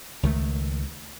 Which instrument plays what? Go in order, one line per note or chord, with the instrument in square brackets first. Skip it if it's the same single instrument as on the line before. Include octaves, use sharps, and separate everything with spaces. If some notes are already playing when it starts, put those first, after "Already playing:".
[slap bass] C#2 D#3 A3